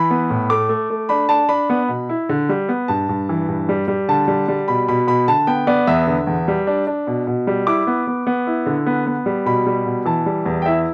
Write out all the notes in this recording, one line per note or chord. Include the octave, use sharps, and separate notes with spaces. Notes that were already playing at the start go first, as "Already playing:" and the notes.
Already playing: E3 B5
B3
A2
A3 D6
A3
A3
D4 B5
D4 A5
D4 B5
B3
B2
E4
D3
G3
B3
G2 A5
G2
E3
G2
G3
G3
D3 A5
G3
G3
B2 B5
B2 B5
B2 B5
D3 A5
B3 G5
B3 D5
E2 E5
D3
E2
G3
D4
D4
B2
B2
G3
E4 D6
B3
B3
B3
E4
D3
B3
B3
G3
B2 B5
G3
B2
E3 A5
G3
E2
G5
E4 E5